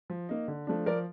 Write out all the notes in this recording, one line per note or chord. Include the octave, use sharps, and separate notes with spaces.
F3
A#3 D#4
D3
F3 A3 D4
F3 A#4 D5